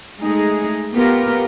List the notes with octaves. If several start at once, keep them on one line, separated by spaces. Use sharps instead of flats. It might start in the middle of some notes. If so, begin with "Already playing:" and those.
G#3 A3 D#4 G#4
B3 F4 G4 A#4